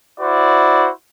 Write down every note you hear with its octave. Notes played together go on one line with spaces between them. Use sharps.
E4 F#4 C5 D5